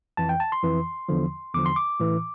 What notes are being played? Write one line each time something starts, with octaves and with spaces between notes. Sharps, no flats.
F2 E3 A5
G5
A5
C6
F2 E3
E2 D3 F3
E2 D3 F3 D6
C6
D6
A2 E3